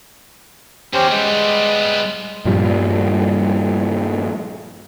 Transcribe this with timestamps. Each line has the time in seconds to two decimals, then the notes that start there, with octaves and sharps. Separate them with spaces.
0.94 E2 C#4 G4 C5
1.11 G3 G#3 B3
2.45 G2 A#2 F3 G3